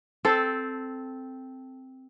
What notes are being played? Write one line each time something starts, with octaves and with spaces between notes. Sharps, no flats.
C4 A4 C5